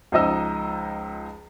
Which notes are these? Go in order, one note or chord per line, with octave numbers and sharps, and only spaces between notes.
C#2 F3 D#4 D#5 E6